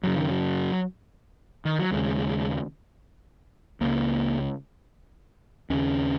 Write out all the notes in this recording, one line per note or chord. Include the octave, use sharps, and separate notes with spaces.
F#2 C#3 F#3
D#3
F#3
D#3
F#3
D#2 C#3 G#3
C#2 C#3 A#3
D#2 C#3 C#4